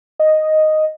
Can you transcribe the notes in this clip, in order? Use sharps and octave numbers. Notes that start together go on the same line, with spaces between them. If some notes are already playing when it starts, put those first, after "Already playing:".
D#5